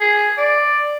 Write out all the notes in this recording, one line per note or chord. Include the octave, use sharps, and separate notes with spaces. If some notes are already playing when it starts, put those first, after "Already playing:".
G#4
D5